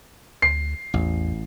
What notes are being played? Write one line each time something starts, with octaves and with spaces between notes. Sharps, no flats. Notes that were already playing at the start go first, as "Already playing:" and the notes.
D2 C7
A1 E2